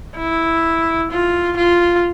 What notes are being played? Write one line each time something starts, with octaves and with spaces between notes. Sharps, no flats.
E4
F4
F4